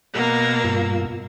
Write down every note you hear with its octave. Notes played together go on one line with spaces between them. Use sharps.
B2 A#3 A#4 F#5 E6
G2 F4